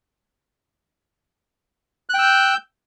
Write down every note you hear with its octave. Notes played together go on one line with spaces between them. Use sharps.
G5 E6 F#6 G6